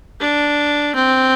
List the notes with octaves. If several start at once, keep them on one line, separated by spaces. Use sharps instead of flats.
D4
C4